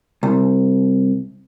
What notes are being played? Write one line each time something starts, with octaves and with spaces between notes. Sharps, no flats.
C2